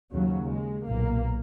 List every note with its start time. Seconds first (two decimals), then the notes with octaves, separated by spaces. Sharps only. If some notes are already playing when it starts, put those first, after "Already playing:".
0.12 D#2 C#3 F#3
0.50 G#3
0.87 B1 A#2 A#3